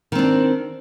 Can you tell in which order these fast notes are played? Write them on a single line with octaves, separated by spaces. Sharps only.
D#3 C4 D4